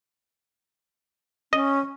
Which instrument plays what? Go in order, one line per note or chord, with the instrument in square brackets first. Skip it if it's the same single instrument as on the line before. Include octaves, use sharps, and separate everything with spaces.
[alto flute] C#4 [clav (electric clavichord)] D#5